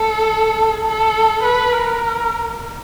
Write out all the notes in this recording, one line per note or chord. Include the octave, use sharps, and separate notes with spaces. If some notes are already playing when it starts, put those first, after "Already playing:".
Already playing: A4
A4
B4
A#4